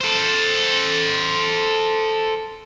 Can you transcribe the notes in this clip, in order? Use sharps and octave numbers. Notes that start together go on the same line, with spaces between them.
A4 C5